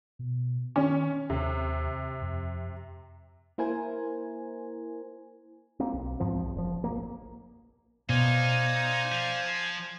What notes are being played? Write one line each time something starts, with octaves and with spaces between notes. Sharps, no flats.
B2
D#3 C#4
D#2 C3
F2
A#3 E4 A#4 C5 G#5
A#3 C4
B1
E2 G#2 F3 C4
A#1
F#1 F3
A#1 F2 A#3
B2 D#4 C5 D5 F5 G#5
F3